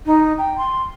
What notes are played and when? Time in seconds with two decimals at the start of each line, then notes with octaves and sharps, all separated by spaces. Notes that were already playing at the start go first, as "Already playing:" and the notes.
0.06 D#4
0.38 G5
0.58 C6